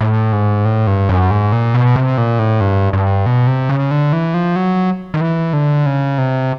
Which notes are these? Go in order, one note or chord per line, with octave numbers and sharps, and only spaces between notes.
A2
G#2
A2
G2
F#2
G#2
A#2
B2
C3
A#2
A2
G2
G2
B2
C3
C#3
D3
E3
F3
F#3
D#3
E3
D3
C#3
C3